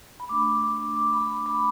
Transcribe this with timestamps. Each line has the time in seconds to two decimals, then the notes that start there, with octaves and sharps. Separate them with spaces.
0.20 B5
0.29 A3 D4 D6
0.64 D6
0.96 D6
1.13 B5
1.30 D6
1.46 B5